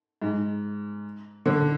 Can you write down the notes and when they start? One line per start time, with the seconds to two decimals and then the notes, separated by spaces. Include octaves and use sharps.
0.22 G#2
1.46 D3